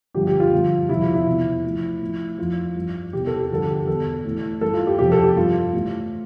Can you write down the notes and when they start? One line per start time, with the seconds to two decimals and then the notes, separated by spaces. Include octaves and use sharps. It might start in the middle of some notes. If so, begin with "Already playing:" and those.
0.14 G2 D3 F3 G4
0.27 G4
0.40 F4
0.53 G2 D3 F3
0.89 F2 C3 F3 E4
1.02 F4
1.14 E4
1.27 E2 C3 F3
1.64 A2 F3
2.02 A2 F3
2.38 F2 E3 F4
2.76 G2 F3
3.13 E2 C3 E3 G4
3.27 A4
3.40 G4
3.50 G2 D3 F3 A4
3.67 G4
3.87 E2 B2 A4
4.25 A2 E3
4.61 G2 E3 A4
4.74 F4
4.87 G4
4.99 F2 C3 E3 G4
5.12 A4
5.24 G4
5.36 G2 F3 F4
5.73 A2 E3